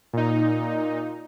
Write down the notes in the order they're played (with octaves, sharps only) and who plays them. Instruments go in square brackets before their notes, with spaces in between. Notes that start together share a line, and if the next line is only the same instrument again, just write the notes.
[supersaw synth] A#2 D#4